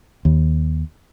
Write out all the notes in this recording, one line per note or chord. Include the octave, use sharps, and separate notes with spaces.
D#2